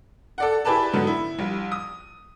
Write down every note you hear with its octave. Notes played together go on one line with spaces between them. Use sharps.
A4 D5 F#5
E4 G4 G#4 B4 D5 A5
G#2 D3 F#3 B3
E4
A#1 G3
D#6